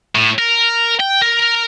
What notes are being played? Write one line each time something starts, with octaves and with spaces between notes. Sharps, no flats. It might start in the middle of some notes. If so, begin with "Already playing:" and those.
A2
A#4
G5
A#4